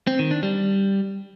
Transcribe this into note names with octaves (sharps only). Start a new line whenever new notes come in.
C4
D#3
D4
G3